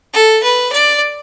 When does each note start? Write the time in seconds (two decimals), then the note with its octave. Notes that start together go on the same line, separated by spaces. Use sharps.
0.14 A4
0.43 B4
0.73 D5